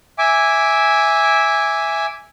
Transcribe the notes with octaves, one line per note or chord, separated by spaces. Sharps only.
E5 G#5 D6